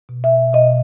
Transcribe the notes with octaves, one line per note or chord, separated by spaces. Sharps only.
B2
E5
B2 D#5